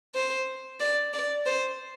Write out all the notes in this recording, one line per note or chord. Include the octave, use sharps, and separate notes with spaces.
C5
D5
D5
C5